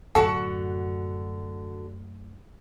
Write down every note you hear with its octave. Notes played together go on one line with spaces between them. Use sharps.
F#2 A2 D3 F#4 A4 F#5